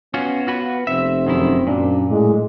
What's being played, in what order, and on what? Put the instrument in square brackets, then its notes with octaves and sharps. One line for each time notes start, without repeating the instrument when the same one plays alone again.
[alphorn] B3 [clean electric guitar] C#4 F4 F#4
[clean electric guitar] F4 F#4 B4
[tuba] F1 [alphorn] C4 [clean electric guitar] E5
[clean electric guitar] F#2 D#3 E4
[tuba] F#2 [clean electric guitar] A#2 [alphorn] D4
[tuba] A2 [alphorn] G#3